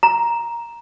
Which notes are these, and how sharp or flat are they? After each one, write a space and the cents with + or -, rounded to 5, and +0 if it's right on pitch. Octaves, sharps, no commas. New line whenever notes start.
A#5 +10